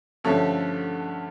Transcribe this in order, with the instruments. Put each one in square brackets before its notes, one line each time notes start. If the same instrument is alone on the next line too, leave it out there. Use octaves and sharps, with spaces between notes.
[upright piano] G2 D3 F3 A3 C#4